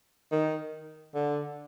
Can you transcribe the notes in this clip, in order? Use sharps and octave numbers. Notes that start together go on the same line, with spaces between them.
D#3
D3